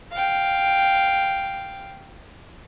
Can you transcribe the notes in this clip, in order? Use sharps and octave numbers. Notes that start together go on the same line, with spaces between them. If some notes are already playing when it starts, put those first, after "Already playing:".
F5 G5